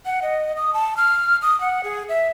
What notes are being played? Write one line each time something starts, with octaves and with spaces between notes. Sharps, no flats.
F#5
D#5
D#6
A5
F6
D#6
F#5
G#4
E5